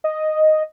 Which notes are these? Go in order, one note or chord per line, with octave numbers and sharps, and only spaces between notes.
D#5